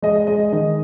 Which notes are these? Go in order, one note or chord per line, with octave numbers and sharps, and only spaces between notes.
G#3 D#5
D#5
G#3 D#5
D#5
D#3 D#5